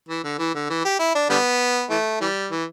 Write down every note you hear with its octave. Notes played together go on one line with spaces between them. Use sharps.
E3
D3
E3
D3
E3
G4
E4
D4
D3 G3 B3
E3 A3
E3 G3
E3